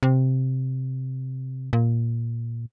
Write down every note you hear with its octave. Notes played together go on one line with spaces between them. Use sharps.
C3
A#2